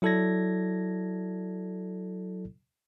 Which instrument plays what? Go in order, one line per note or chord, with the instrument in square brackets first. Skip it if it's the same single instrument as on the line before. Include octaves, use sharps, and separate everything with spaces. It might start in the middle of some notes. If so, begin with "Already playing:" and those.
[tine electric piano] F#3 E4 A4 D5 G#6 A#6